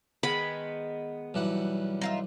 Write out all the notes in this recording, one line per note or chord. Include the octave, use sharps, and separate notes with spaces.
D#3 G#3 B3 B5
B1 E3 G3 F#5
D#4 F4 E5